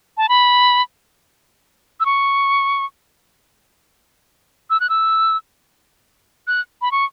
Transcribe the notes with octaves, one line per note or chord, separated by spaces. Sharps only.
A5
B5
E6
C#6
E6
F#6
E6
F#6
B5
C#6